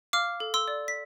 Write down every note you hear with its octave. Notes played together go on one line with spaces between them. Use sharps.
F5 D6 F6
A4
C6 E6
D5
B6